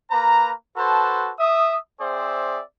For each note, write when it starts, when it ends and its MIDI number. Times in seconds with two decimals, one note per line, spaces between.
0.11 0.52 58
0.11 0.52 71
0.11 0.52 82
0.77 1.31 66
0.77 1.31 69
0.77 1.31 71
0.77 1.31 72
0.77 1.31 81
1.39 1.76 76
1.39 1.76 87
2.00 2.62 60
2.00 2.62 68
2.00 2.62 72
2.00 2.62 74
2.00 2.62 76